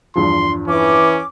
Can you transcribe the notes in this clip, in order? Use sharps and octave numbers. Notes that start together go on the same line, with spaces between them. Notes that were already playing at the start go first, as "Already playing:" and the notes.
E2 G2 F3 C6
E3 C#4 D6